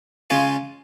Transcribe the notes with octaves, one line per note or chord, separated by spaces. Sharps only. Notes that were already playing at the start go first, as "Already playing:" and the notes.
C#3 G#3 C#4 F4